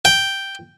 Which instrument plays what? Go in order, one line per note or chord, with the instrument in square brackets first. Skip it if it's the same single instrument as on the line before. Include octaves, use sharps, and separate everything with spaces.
[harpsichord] G5